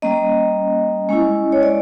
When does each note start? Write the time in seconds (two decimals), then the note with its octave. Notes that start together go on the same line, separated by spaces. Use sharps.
0.02 G3 A#3 C#4 D#5
1.09 G#3 C#4 E4
1.52 C#5
1.63 D5